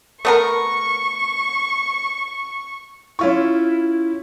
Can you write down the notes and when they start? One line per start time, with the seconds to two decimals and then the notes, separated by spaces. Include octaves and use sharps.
0.25 A3 B3 A#4 C#6
3.19 C#4 E4 F4 C#6